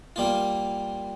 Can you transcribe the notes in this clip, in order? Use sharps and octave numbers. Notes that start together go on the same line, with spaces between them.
G3 A#3 F4